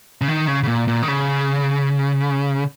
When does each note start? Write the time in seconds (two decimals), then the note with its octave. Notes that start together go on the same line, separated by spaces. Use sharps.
0.21 C#3
0.28 D#3
0.47 C#3
0.63 C#3
0.68 A#2
0.88 A#2
1.03 D#3
1.08 C#3